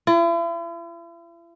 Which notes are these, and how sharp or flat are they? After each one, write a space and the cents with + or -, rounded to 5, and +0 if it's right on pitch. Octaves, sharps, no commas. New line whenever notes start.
E4 +45